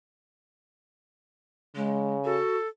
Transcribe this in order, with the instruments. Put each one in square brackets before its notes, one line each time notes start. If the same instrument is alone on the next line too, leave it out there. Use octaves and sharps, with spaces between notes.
[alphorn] C#3 [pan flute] G#3
[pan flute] F#4 [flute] A4